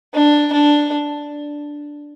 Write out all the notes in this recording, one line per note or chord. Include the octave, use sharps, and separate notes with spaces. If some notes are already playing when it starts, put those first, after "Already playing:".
D4
D4